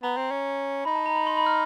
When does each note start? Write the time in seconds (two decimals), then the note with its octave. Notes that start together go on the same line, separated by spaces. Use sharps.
0.03 B3 A#5
0.17 C4
0.31 C#4
0.85 D#4 B5
0.95 A5
1.06 A#5
1.16 B5
1.27 C6
1.37 B5
1.46 F6